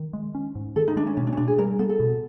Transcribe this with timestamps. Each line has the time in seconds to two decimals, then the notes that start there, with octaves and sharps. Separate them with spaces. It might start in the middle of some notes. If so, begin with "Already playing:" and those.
Already playing: D#3
0.13 G#3
0.35 C#4
0.55 G#2
0.76 D#3 A4
0.88 D#4
0.96 G#3 D4
1.07 C#4
1.17 B2 C#4
1.27 D4
1.33 C#4
1.37 B2 D4
1.48 G#4
1.58 G3 A#4
1.79 B3 A4
1.89 A4
2.00 B2